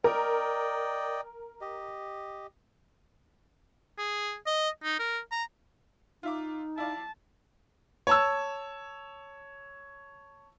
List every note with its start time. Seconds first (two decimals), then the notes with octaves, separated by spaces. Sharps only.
0.04 A#4 D5 D#5 G5
1.61 G4 D#5
3.98 G#4
4.46 D#5
4.84 D#4
4.99 A#4
5.32 A#5
6.23 D#4 F4 E5 D6
6.78 E4 D5 F5 A5
8.07 C#5 A5 E6